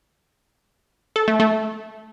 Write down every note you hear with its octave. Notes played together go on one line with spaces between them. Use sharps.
A4
A3
A3